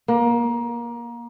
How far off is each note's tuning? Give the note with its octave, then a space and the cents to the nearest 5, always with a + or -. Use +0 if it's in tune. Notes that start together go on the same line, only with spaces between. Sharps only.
A#3 +25